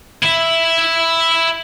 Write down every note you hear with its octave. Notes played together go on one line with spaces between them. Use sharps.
E4 E5